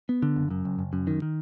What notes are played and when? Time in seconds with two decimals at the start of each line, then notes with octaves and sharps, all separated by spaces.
0.09 B3
0.22 D3
0.36 F#1
0.50 F#2
0.65 F#1
0.79 F#1
0.93 F#2
1.07 D#3
1.22 D#3